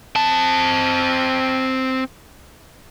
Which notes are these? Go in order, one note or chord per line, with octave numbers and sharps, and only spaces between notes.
C4 A5